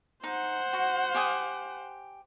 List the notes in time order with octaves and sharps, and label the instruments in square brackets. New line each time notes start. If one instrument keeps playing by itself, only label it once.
[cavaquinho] D#4 [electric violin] C5 F#5
[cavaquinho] F#4
G4 G#5 D#6